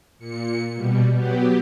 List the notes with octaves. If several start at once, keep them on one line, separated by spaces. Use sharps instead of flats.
A#2 C#7
B2 G3
F#3 B3 G4